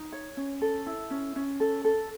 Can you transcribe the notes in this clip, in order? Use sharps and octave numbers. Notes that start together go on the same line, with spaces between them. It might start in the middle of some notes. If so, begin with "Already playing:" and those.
Already playing: D#4
C#5
C#4
A4
E4
C#4
C#4
A4
A4